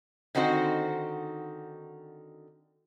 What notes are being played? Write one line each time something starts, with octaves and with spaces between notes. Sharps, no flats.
D3 D#3 C4 D#4 F#4 C5